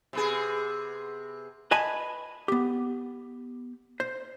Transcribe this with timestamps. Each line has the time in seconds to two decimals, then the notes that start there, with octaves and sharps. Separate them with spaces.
0.13 C3 B3 G#4
1.71 B4 D#5 G#5 A5 B5
2.48 B3 G4
4.00 C5